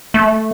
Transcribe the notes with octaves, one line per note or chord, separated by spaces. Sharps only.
A3